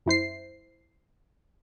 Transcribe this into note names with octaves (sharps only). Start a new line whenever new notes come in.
F#2 E4 C5 C7